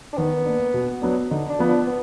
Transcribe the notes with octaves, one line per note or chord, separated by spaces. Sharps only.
D4
D#3 B3
A#3 D4
B2
F#3 B3 D4
D3 D#4
D4
F3 B3
D4
B3